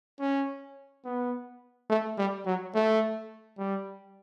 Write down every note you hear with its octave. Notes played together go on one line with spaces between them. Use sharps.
C#4
B3
A3
G3
F#3
A3
G3